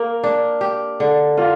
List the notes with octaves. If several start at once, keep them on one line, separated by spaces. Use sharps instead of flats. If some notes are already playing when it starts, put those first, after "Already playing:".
Already playing: A#3 A#4
D4
G4
D3
A#3 F4